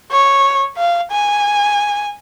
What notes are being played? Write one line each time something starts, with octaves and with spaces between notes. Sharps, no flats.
C#5
F5
G#5